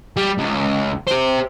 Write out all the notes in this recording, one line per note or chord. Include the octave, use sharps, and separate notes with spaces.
G3
C#2
G4 C5